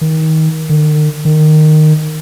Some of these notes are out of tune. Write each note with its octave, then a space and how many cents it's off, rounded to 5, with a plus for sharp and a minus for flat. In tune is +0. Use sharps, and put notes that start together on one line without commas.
D#3 +25
D#3 -45
D#3 -15